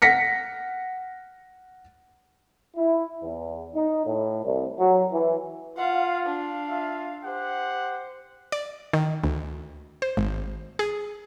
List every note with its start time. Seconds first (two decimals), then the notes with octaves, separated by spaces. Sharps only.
0.02 F#5 A#6 B6 C#7
2.76 E4
3.23 E2
3.75 D#4
4.06 A2
4.45 C2
4.79 F#3
5.13 E3
5.77 F4 F5 F#5
6.26 D4 F5
6.68 F4 E5
7.24 G4 C5 F#5
8.52 D5
8.93 D#3
9.24 D2
10.02 C5
10.17 G#1
10.79 G#4